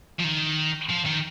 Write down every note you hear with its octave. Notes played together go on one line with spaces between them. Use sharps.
F3
D#3
F3
D#3